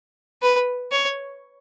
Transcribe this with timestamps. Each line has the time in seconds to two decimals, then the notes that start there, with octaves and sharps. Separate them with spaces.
0.42 B4
0.92 C#5